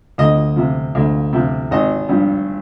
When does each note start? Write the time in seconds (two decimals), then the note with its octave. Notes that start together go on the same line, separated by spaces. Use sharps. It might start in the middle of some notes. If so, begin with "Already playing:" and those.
0.18 D2 D#5
0.56 C3 F3
0.95 D2
1.33 C3 F3
1.71 G#1 D#5
2.09 G2 F3